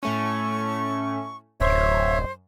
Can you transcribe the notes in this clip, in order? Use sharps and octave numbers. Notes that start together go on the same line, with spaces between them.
A2 A3 C#4 C#6
D1 F#2 C5 C#5 E5